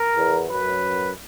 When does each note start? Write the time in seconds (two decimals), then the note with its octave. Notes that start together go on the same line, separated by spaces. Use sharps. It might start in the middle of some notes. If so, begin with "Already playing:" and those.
Already playing: A#4
0.17 E2
0.50 F#2 B4